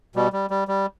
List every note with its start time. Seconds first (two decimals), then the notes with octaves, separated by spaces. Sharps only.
0.15 B2 G3
0.33 G3
0.50 G3
0.68 G3